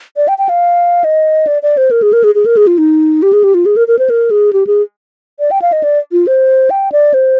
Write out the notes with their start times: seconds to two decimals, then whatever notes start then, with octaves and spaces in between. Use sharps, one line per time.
0.17 D5
0.28 G5
0.38 G5
0.49 F5
1.04 D#5
1.47 D5
1.63 D5
1.77 C5
1.91 A#4
2.02 G#4
2.13 A#4
2.24 G#4
2.35 G#4
2.46 A#4
2.57 G#4
2.67 F4
2.78 D#4
3.22 G4
3.33 G#4
3.44 G4
3.54 F4
3.66 G#4
3.76 A#4
3.88 A#4
3.99 C5
4.10 A#4
4.31 G#4
4.53 G4
4.67 G#4
5.40 D5
5.51 G5
5.62 F5
5.73 D#5
5.83 D5
6.12 F4
6.27 C5
6.70 G5
6.92 D5
7.14 C5